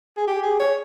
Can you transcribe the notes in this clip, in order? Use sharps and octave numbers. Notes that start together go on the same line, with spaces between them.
G#4
G4
G#4
C#5